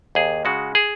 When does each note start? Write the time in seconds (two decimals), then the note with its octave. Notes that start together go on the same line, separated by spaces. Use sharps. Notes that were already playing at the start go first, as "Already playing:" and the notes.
0.15 D#2 G#4
0.45 C#3 G#3 F#4
0.75 G#4